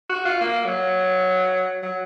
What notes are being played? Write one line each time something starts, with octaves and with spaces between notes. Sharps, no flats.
F#4
F4
A#3
F#3
F#3